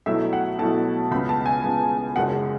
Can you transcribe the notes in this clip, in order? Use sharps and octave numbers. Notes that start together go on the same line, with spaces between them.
B1 B2 F#3 A3 E4 E5
F#5
B1 B2 F#3 A3 E4 A5
C#2 C#3 G#3 B3 B5
A5
G#5
C#2 C#3 G#3 B3
F#1 F#2 C#3 G#3 F#5